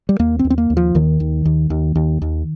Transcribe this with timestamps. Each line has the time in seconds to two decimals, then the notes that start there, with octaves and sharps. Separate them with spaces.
0.09 G3
0.19 D#2 A#3
0.39 C4
0.44 D#2
0.50 C4
0.58 A#3
0.70 D#2
0.77 F3
0.95 D#2 D#3
1.20 D#2
1.45 D#2
1.70 D#2
1.95 D#2
2.22 D#2